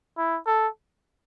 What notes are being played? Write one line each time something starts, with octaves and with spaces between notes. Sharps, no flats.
E4
A4